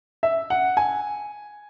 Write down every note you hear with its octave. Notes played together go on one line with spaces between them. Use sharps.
E5
F#5
G#5